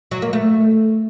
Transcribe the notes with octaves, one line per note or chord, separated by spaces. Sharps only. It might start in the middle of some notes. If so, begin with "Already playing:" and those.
F#3
A#3
A3